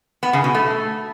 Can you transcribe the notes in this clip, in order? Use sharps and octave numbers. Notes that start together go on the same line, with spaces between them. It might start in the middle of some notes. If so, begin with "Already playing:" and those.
B3
C#3
B2
A3